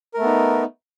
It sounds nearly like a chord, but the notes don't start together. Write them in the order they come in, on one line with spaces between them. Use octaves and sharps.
A#4 A3 B3 D#4